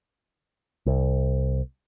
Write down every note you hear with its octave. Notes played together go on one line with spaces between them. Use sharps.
C2